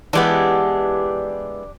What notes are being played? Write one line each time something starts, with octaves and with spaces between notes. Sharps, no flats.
E3 G#3 B3 D4 G4